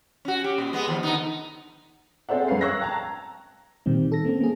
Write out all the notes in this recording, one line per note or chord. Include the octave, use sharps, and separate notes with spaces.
C#4 F#4
G4
A#2
G#3 B3
D#2 F3
D3 B3 D#4
C4 G#4 A4 C5 E5 F#5
F#2 G#3 C#4 B4 F5 C7
F5 C#6 E6 F#6 G#6 A#6
G5 A5 A#5
A#2 D#3 G3 C4
A4 A#6
A#3 C4 C#4
A#3 G#4